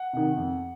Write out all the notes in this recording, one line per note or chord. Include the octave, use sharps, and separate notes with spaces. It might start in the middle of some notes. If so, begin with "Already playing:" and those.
Already playing: F#5
C3 D#3
F2